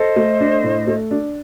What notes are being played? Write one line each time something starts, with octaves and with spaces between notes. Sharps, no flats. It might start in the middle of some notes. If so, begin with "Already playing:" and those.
Already playing: A4 C5 D#5
A3
D4
A2
A3
D4